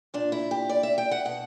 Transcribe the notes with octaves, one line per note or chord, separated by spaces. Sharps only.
A#2 D4
E4
G4
D5
E5
G5
F#5
B2 F#5